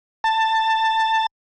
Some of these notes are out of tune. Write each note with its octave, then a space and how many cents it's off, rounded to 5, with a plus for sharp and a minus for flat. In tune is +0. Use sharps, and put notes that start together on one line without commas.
A5 +15